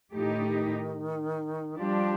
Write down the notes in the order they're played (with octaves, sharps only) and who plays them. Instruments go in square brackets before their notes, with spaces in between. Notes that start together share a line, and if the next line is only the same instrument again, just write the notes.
[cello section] A2 A3 D#4 G4 [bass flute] F3
[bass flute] D#3
D3
D#3
[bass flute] F3 [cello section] G3 D4 G4